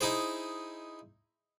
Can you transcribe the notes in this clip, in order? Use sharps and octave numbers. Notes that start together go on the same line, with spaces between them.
D#4 E4 G#4 C5